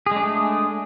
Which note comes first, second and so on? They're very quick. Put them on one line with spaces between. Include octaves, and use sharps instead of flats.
G#4 G#3 D4 A3